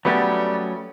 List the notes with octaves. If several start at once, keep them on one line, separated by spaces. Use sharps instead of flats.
F#3 G3 A3 B3 C#4